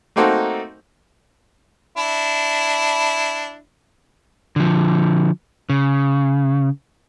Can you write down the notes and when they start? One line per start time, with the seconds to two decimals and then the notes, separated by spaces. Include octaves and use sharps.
0.16 A3 A#3 C4 D#4 F#4 A4
1.98 D4 E4
4.56 D3 F3
5.70 C#3